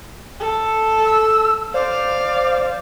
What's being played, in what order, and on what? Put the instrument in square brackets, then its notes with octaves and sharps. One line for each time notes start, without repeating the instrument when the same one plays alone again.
[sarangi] A4
[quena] E6
[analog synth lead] C5 [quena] D5 [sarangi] F5